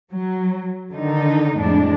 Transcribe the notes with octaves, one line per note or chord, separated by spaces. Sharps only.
F#3
D3 D#3 D#4
F2 A2 G#3 D4